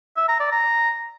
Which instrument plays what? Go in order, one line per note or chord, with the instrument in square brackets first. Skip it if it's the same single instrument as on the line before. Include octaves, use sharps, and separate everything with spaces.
[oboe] E5
A#5
D5
A#5